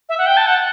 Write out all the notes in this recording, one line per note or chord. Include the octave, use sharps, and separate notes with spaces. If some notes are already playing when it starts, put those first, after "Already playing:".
E5
F#5
G5
A5
F#5